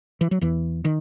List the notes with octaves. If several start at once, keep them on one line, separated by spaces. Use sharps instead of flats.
E3
F#3
E2 E3
D#3